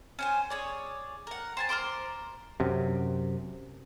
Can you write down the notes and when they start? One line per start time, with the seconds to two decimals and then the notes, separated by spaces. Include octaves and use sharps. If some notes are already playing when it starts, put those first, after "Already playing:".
0.19 C#4 C5 G#5
0.50 G#4 C#5 D5
1.27 A#4 F#5
1.57 C5 G#5 A5
1.69 A#4 C5 C6 D6
2.60 F#2 C3